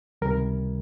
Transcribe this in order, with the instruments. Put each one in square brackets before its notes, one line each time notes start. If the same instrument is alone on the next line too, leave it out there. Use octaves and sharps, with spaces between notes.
[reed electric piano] C#2 C3 D#3 G3 A#4